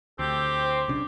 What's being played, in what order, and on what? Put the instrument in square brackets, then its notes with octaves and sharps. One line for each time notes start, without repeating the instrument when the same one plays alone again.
[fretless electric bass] D2 [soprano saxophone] C4 [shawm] G4 [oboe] A4
[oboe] C5
[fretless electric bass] B1 C#3 D4 [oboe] D6